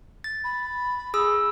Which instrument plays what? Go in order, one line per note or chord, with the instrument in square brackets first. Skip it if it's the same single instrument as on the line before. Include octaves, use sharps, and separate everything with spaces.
[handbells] A6
[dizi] B5
[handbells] G#4 E6